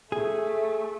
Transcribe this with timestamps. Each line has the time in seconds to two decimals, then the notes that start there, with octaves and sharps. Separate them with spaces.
0.12 A3 G#4